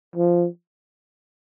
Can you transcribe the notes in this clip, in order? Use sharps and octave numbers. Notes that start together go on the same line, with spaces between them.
F3